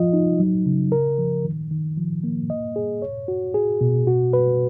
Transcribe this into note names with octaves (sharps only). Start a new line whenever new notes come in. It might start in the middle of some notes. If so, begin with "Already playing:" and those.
Already playing: F3 F4 D#5
D#4
F#3
C#3
A#4
F3
D#3
D#3
F3
A#3
D#5
G#4
C#5
F#4
G#4
B2
F#4
B4